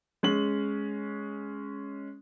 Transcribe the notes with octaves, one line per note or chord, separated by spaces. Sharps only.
G#3 C#4 F#7